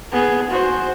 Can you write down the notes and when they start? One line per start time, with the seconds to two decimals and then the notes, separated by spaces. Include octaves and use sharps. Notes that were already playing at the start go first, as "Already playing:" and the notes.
0.13 B3 G#4
0.51 F#4 C5